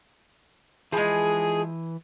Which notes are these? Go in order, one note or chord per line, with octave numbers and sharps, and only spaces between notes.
E3 F3 G#3 G#4 B5